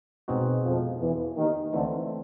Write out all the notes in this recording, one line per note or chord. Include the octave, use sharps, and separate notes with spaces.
B2 G#3 C4 D#4 F#4
F2 F3
E2 E3
D#2 D#3
D2 D3 E3 A3 C4